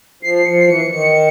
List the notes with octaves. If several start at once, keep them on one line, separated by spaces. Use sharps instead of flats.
F3 C7
C7
F3 C#7
C7
E3 C#7
E3
D#3 C#7